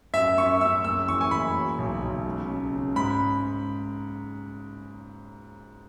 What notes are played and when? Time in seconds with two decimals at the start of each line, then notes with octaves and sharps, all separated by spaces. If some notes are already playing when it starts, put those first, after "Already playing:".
0.13 F#2 E5
0.37 F#2 C#6
0.61 F#2 E6
0.84 F#1 E6
1.08 E3 C#6
1.21 G#5
1.31 F#1 B5
1.56 F#3
1.78 B1
2.02 B1
2.26 C#2
2.48 C#3
2.73 C#3
2.96 G#2 B5